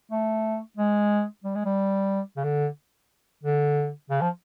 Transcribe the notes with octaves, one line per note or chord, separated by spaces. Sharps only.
A3
G#3
G3
G#3
G3
C#3
D3
D3
C#3
F3